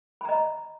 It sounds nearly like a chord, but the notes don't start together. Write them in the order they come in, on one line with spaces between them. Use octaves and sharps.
B5 A#5 D#5